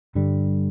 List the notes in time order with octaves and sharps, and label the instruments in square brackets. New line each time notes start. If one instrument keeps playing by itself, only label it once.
[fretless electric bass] G2 D3 G3